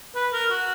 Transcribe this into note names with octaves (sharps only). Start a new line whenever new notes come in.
B4
A#4
F#4